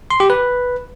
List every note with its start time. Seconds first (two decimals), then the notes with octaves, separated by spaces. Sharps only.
0.10 C6
0.20 G4
0.30 B4